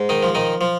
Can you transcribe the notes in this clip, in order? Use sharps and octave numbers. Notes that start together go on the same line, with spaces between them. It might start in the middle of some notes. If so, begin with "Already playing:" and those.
Already playing: G#2
D#3 D#4
F3
D#3 D#4
F3